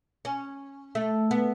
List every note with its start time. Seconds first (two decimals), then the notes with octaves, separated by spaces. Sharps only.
0.25 C#4
0.95 A3
1.31 B3